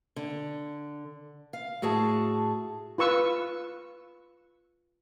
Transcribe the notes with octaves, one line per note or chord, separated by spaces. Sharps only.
D3
F5
A2 F#4 G#4 A5
F4 B4 C#6 E6